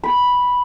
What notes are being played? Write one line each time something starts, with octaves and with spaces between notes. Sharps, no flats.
B5